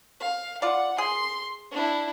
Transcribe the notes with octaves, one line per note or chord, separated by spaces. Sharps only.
F5
F4 D5 F#5
G#4 C6
D4 E4